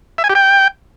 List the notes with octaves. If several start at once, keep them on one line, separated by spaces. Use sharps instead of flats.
E5
G#5
G4
G5